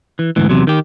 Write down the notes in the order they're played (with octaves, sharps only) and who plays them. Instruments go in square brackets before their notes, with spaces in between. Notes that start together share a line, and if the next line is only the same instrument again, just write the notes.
[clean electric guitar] E3
D2 G#2 E3
E2 C3 F#3
D#3 G4